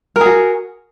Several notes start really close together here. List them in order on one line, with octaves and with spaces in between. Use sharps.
A#4 G#4 F#4